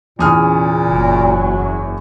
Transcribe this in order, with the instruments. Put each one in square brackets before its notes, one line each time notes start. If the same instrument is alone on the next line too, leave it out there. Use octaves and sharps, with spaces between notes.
[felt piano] E2 D#6 F6 [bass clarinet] A#2 [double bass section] C#3
[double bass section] F#1 F#3